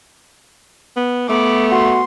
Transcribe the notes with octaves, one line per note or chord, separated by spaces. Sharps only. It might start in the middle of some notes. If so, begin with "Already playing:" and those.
B3
A3 B3 D6
F#4 C6